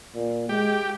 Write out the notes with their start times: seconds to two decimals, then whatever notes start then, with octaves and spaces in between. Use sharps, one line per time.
0.15 A#2
0.49 G#3 G4